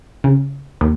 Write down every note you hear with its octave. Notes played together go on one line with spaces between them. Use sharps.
C#3
D#2